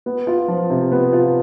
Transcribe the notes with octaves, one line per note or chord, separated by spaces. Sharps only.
B3
F4
F3
C3
B3
F4